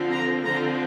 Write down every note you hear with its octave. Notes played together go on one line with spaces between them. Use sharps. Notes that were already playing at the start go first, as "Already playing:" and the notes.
Already playing: D3 F3 C4
A#5
D3 F3 C4 A#5